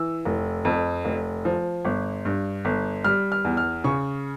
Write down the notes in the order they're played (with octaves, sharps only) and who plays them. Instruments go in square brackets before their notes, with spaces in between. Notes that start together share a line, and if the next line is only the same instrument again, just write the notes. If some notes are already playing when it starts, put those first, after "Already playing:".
Already playing: [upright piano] E3 E6
F1
F2
F1
F3
G1
G2
G1
G3 F6
F6
E2
F6
C#3 C#6